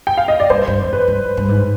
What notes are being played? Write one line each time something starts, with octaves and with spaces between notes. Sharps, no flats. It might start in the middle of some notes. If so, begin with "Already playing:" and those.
G5
F5
D#5
D5
G2 C5
G2
F2
B4
G2
G2
G#2